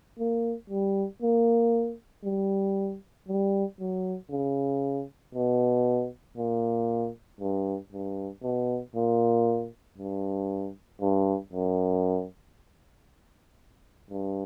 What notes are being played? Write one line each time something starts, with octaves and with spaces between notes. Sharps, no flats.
A#3
G3
A#3
G3
G3
F#3
C#3
B2
A#2
G2
G2
B2
A#2
G2
G2
F#2
G2